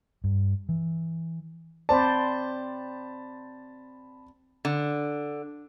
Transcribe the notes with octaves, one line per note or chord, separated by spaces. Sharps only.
G2
E3
C4 C5 D5 A5 B5
D3